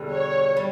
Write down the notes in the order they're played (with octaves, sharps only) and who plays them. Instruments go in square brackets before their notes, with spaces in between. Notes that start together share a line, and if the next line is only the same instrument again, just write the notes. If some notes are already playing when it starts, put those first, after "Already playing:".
Already playing: [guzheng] E2 B2 D3 G3
[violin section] C#5
[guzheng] G3